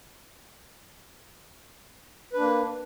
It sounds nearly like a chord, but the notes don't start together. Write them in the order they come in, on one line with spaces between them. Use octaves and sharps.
B4 D4 A#3